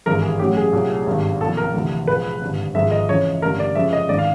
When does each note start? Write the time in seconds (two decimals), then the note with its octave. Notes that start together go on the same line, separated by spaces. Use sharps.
0.06 G#1 G2 E3 G#3 A#4
0.22 G#4
0.39 A1 A2 F#3 G4
0.57 G#4
0.73 C2 A#2 F#3
1.07 G#1 G2 D#3
1.40 B1 A#2 F3 A4
1.57 A#4
1.74 D2 C3 E3
2.08 A#1 A#2 F3 G#3 B4
2.41 G#1 G2 D3
2.74 G#1 G#2 F3 G#3 E5
2.91 D#5
3.09 F2 C#3 E3 C#5
3.42 A1 G2 D3 A#4
3.60 D5
3.75 F2 C#3 F3 G#3 E5
3.93 D#5
4.09 G#1 G#2 D#3 D5
4.19 F5